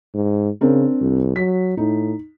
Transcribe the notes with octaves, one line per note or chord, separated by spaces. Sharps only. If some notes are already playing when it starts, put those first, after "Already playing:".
G#2
C#3 C4 D4 A#4
C2
F#3 B6
A2 D#4